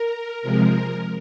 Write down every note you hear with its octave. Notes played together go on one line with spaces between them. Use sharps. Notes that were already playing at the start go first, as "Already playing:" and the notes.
Already playing: A#4
C3 F3 G#3 A#4